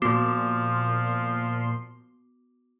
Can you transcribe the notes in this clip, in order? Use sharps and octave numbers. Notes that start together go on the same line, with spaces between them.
A#2 F3 B3 F#4 C6 D6